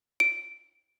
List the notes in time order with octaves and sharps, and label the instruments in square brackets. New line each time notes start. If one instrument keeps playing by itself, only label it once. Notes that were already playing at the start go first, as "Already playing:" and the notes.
[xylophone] D7